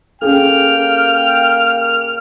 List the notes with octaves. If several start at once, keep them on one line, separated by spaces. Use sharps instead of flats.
A#3 C#4 G#4 A4 G5 F6